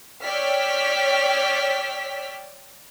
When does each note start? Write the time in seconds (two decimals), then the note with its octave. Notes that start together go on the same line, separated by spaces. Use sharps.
0.23 C#5 D5 G5 E6 F6 B6